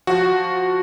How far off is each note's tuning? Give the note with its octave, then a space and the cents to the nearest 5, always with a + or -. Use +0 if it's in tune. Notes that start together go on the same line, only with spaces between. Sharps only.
F3 +15 F#4 +0